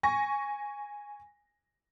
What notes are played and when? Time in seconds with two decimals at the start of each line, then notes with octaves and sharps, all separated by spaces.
0.03 G#5 C#6 A#6